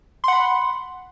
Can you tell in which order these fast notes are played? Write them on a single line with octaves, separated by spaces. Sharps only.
C6 F#5 B5